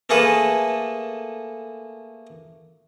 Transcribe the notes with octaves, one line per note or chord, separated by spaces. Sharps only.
A3 A#3 G#4 A4 B4